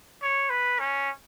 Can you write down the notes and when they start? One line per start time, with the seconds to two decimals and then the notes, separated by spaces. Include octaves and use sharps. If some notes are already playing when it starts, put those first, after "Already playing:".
0.22 C#5
0.50 B4
0.80 C#4